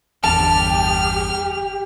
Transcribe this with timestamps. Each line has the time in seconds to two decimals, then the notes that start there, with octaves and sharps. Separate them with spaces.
0.24 G1 E2 G4 A5 F6